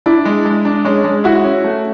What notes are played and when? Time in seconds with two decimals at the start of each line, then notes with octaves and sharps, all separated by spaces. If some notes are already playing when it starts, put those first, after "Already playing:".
0.06 D4 E4
0.25 G#3
0.45 G#3
0.65 D4
0.85 G#3 C#4
1.04 G#3
1.24 E4 F#4
1.44 C#4
1.64 A3